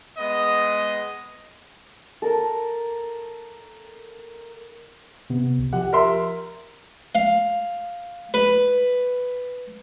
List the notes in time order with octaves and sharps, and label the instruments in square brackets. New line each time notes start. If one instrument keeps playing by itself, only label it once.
[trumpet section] G#3 B3 D#5
[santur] A4 A#4
[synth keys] C3 B3
C#2
[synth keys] F3 G4 [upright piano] F#5
[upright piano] A#4 E5 C6
[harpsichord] F5
B4